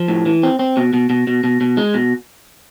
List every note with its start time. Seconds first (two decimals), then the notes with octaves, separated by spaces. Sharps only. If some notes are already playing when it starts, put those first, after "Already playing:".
Already playing: F3
0.08 A2
0.26 E3
0.43 C4
0.59 C4
0.77 B2
0.93 B2
1.10 B2
1.27 B2
1.44 B2
1.61 B2
1.77 G#3
1.94 B2